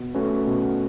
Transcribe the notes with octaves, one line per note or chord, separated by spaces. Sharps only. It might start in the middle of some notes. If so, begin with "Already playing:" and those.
Already playing: B2
A3 C#4 F#4 B4
B2